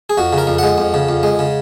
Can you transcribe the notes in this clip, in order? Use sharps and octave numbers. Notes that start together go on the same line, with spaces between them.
G#4
F2 F#4
C#3 A#4
F2
G#3 F#5
F2
C#3
F2
G#3
C#3